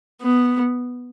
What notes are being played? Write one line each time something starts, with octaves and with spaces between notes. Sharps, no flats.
B3